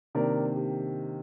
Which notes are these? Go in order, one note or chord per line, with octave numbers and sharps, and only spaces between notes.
C3 D#3 A#3 D4 A#4 D5
G4